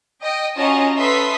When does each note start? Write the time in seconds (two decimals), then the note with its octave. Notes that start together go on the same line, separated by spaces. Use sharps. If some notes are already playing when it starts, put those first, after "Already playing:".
0.22 D#5 G5
0.57 C#4 F4 F#4 D#5 A5 A#5
0.97 A4 B4 E5 C6 D#6 B6